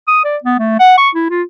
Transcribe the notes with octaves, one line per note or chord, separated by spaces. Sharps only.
D#6
D5
B3
A3
F#5
C#6
E4
F4